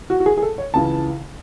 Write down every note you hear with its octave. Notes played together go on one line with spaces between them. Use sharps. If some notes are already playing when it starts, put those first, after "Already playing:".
F#4
F#4
G#4
G#4
A4
C#5
C#2 C#3 E3 A5